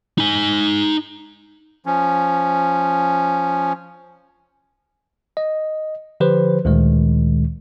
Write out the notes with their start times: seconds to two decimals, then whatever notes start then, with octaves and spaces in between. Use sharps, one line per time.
0.18 D#4 G#5
1.86 F3 C#4
5.37 D#5
6.20 D3 F3 G4 B4 C5
6.65 D2 A#2 D#3 G#3